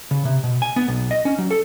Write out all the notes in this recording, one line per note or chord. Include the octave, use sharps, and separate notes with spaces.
C#3
C3
B2
G#5
B3
B1
D#5
C#4
F#3
A4